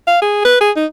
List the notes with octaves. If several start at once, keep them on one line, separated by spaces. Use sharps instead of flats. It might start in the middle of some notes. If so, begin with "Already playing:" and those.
F5
G#4
B4
G#4
D#4